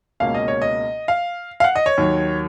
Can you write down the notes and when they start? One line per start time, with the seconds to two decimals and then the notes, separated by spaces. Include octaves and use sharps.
0.20 C#2 B2 A#3 C#4 F5
0.35 D#5
0.48 C#5
0.62 D#5
1.08 F5
1.60 F5
1.64 F#5
1.76 D#5
1.86 C#5
1.98 D#2 D#3 F#3